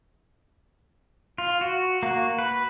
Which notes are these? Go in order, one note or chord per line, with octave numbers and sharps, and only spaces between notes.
F4
F#4
A#3 F#4
B4